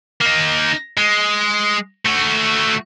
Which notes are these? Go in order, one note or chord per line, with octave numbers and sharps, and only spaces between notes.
A#3 D#4
G#3
A3 F#4